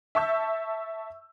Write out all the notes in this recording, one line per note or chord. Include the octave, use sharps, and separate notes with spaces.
E5 A5 C#6 E6 G6